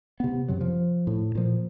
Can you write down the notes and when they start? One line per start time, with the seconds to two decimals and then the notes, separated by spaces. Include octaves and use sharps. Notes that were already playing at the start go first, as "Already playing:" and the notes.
0.20 C3 B3
0.48 F#2 C3 F#3
0.61 F3
1.07 A2
1.35 A#2 F3